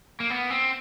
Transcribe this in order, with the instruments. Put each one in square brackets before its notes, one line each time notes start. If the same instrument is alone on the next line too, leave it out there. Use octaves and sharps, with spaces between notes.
[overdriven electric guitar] A#3
B3
C4